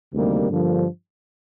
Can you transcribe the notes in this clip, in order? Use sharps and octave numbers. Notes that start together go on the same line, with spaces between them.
D2 C3 D#3 G3 A#3
G2 D3 F3 A#3